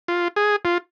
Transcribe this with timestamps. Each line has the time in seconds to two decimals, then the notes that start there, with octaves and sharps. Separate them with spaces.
0.08 F4
0.36 G#4
0.65 F4